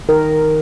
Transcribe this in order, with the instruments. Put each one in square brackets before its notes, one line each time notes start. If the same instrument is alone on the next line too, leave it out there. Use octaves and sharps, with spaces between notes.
[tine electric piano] D#3 [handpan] A#4